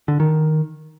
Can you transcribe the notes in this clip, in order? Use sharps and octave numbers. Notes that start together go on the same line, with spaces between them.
D3
D#3